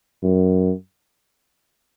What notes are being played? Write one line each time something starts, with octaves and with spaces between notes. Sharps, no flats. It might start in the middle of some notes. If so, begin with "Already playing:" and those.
F#2